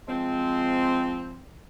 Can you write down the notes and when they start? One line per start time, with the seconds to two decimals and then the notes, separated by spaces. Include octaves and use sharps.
0.08 F3 G#3 C4